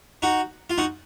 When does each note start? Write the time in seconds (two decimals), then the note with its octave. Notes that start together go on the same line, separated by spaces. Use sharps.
0.22 D#4 F#4
0.70 F4
0.78 D#4 F#4